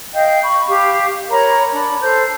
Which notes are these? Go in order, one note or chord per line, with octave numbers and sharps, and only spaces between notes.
D#5 F5 G5 G6
B5 C#6
G4 F5
A#4 C#5 A#5 B5
D4 B5
A4 C5 G6